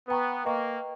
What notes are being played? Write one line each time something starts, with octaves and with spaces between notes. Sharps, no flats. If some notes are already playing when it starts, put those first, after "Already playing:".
B3 B4 G5 A#5 C#6
A#3 B4 D#5 G5 C#6